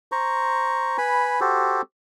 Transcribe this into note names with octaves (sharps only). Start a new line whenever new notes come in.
C5 A#5 C#6
B4 G#5 B5
F#4 G4 A4 C5